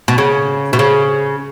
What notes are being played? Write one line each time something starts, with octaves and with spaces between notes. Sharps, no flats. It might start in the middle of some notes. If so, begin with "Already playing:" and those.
B2
C#3
B2
C#3